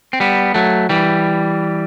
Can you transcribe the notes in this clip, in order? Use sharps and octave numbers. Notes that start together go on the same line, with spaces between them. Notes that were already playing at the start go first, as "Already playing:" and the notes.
C4
G3 B3
F#3 A3
E3 G3